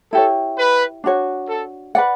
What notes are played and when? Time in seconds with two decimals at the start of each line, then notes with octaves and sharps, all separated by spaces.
0.13 E4 G4 A4 C#5
0.58 B4
1.04 D4 F#4 C#5
1.49 A4
1.95 B4 D5 F#5